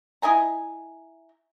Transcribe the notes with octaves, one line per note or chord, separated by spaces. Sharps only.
E4 D#5 G#5 A#5